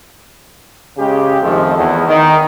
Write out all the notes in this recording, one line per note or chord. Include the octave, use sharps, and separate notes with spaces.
C#3 G#3 G4
F2 D#3 F3 G#3 A3
E2
D#3